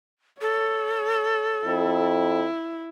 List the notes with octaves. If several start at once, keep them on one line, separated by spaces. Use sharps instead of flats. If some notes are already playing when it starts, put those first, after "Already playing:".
A4 C#5
F2 E4